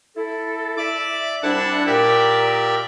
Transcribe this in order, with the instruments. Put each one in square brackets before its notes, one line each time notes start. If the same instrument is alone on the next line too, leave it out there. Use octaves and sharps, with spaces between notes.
[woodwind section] E4 A4
[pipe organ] D5 D6 [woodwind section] E5
[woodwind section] C2 G3 D4 [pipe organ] E4 F#5 A5
[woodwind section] A#2 A#4 [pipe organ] G4 D5 E5